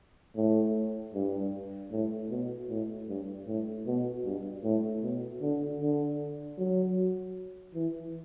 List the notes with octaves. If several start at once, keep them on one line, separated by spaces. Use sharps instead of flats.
A2
G2
A2
B2
A2
G2
A2
B2
G2
A2
B2
D3
D3
F#3
E3